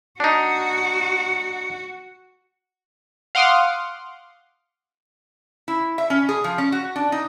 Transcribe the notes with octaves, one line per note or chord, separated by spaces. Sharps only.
D4 D#4 F#4
F5 F#5 C6 D6 D#6 F6
E4
E5
C#4
G#4
F3
C#4
F#4
D4
D#4